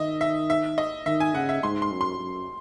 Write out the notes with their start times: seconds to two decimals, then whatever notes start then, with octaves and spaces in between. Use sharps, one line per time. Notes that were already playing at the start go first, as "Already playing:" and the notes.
Already playing: D#3 D#5 E5
0.21 E5
0.50 E5
0.78 D#5
1.06 D#3 E5
1.20 G#5
1.34 C#3 F#5
1.49 E5
1.63 G#2 C6
1.82 C6
1.91 F#2
2.01 C6
2.19 F#2